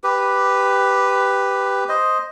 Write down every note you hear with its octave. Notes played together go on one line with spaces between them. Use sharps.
G4 B4
C5 D#5